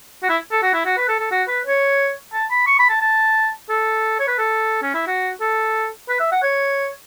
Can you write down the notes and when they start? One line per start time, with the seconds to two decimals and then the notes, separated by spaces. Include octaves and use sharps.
0.23 F#4
0.29 E4
0.51 A4
0.63 F#4
0.74 E4
0.85 F#4
0.97 B4
1.08 A4
1.19 A4
1.31 F#4
1.48 B4
1.65 C#5
2.33 A5
2.51 B5
2.67 C#6
2.79 B5
2.90 A5
3.01 A5
3.69 A4
4.19 C#5
4.28 B4
4.38 A4
4.82 C#4
4.94 E4
5.07 F#4
5.41 A4
6.09 B4
6.20 E5
6.32 F#5
6.43 C#5